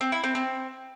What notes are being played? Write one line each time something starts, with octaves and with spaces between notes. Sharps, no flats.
C4
E4
C4
C4